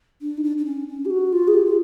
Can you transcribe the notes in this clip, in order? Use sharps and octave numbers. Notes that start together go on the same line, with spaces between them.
D4
D#4
D4
D4
C#4
C#4
G4
F#4
F4
G#4
G4
F4